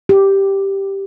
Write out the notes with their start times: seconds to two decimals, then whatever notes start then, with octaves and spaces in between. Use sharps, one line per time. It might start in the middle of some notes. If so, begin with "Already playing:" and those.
0.09 G4